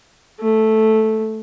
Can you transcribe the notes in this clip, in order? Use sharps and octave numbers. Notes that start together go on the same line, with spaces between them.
A3